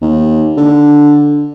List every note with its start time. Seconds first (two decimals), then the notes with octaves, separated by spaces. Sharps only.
0.01 D#2
0.57 D3